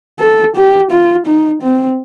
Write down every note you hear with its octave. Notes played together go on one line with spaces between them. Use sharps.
A4
G4
F4
D#4
C4